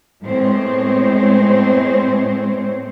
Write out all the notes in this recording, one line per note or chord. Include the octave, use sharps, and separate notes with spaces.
A2 G#3 B3 C4 C5 C#5